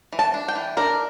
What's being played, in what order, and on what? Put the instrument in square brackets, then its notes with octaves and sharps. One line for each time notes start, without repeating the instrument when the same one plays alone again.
[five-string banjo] E3
A5
D4
G5
E3
D4 A#4